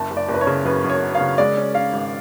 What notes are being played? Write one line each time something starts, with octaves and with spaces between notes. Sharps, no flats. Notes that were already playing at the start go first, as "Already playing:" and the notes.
Already playing: F#1 A5
F#1
D5
F#1
B4
C#5
C#3
F#2 B4
F#2
C#5
F#3
F5
C#3
G#3 D5
C#4
C#4 F5
G#1